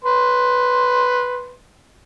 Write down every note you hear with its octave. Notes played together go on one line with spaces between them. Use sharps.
B4 C6